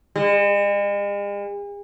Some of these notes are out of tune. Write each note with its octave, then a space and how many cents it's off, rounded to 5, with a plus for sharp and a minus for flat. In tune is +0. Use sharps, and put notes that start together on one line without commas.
G#3 -45